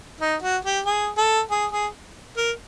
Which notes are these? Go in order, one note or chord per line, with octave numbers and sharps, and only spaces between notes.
D#4
F#4
G4
G#4
A4
G#4
G#4
A#4